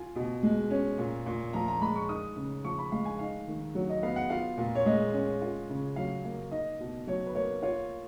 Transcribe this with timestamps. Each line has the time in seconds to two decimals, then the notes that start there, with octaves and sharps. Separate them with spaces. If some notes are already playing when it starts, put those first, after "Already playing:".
Already playing: F4 G#5
0.16 B2
0.43 G#3
0.70 C#4
0.98 A#2
1.26 A#2
1.53 F3 A#5
1.68 A#5
1.81 G#3 B5
1.96 C#6
2.09 D#4 D#6
2.36 C#3
2.65 F3 C#6
2.79 B5
2.92 G#3 F5
3.06 G#5
3.19 D#4 F5
3.48 D#3
3.75 F#3
3.89 D#5
4.03 B3 F5
4.16 F#5
4.30 F4 F5
4.58 A#2
4.75 C#5
4.86 G#3 D#5
5.13 C#4
5.42 F4
5.69 C#3
5.96 F#3 F5
6.25 A#3
6.51 D#4 D#5
6.80 B2
7.07 F#3 C#5
7.26 B4
7.35 A#3 C#5
7.62 F4 C#5